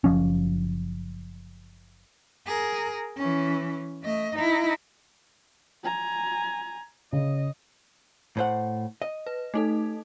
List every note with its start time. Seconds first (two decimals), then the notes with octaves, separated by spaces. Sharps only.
0.04 F#1 E2 F3 C#4
2.47 G#4 A#4
3.17 E3 C#4
4.02 A3 D#5
4.35 D#4 E4
5.84 G#5 A#5
7.13 C#3 D#5
8.37 A2 C5 F#5
9.02 D#5
9.27 B4
9.54 A3 D#4 A4